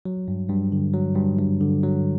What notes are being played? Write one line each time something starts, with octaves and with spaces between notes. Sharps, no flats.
F#3
G2
G2
D3
F#3
G2
G2
D3
F#3